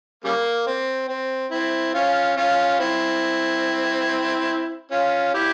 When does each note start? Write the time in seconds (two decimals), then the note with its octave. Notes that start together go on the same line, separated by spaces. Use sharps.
0.24 C#3 G3 A#3
0.66 C4
1.09 C4
1.51 C4 E4
1.94 C#4 F4
2.37 C#4 F4
2.79 C4 E4
4.91 C#4 F4
5.34 E4 G4